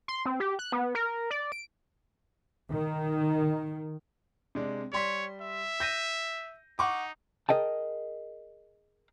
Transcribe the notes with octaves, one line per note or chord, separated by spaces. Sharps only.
C6
C4
G4
F#6
B3
A#4
D5
D7
D#3
C3 G#3 D4
G3 C#5 C6 B6
E5
G6 A#6 D#7
D#4 F#5 C#6 D6
G#4 A#4 D#5 G5 A5